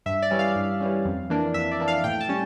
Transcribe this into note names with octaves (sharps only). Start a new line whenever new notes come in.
G2 E5
D5
E3 G3 C#4
F5
G2
E3 G3 C#4
F2
E3 A#3 D4
F2 E5
D5
E3 A#3 D4
F5
A2 G5
A5
G3 C#4